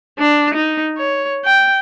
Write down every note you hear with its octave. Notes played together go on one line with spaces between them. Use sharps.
D4
D#4
C#5
G5